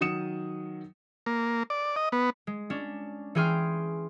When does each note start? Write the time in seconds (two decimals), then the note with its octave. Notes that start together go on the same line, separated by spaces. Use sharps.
0.01 D#3 F#3 D#6 C#7 E7
1.26 A#3
1.70 D5
1.96 D#5
2.12 B3
2.47 G#3
2.70 C#4 D4
3.35 E3 C#4 G#4 G5 C6 F6